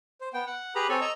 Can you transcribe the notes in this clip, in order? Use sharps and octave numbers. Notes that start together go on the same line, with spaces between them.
C5
B3 G5
F#5
G4 G#4 B4 A#5 B5
C4 A4 C#5 G#5
D#5 A#5 E6